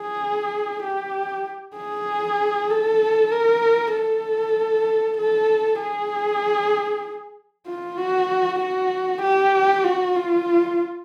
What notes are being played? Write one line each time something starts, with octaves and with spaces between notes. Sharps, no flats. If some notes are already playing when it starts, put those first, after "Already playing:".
Already playing: G#4
G4
G#4
A4
A#4
A4
A4
G#4
F4
F#4
F#4
G4
F#4
F4